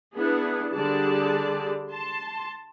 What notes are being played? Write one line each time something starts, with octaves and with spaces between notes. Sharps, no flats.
B3 D4 E4 G#4
D3 G3 G#4 D5 A5
A5 C6